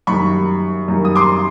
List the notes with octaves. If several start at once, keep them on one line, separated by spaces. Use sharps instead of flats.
F#2 D#3 G3 A#3 B5 C#6
F#2 D#3 G3 A#3
D#6
C6 D6